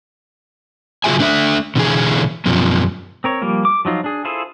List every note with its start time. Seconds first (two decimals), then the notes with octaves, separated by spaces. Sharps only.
1.04 C#3 F#3 F4 G#4 E5 G#5
1.19 A3 D4 C#5 E5
1.76 B2 D3 E3 G#4
2.46 F#2 B2 F3
3.24 C4 A#4 C#5
3.42 F3 G3 A#3
3.65 D6
3.85 F3 F#3 D#4 F4
4.04 D4 G#4
4.25 E4 F4 G#4 A4 C5